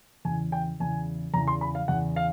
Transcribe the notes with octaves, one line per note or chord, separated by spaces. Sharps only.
E2 C#3 E3 G#5
G5
E2 C#3 E3 G#5
E2 C#3 E3 A#5
C6
B5
F5
E2 C#3 E3 F#5
F5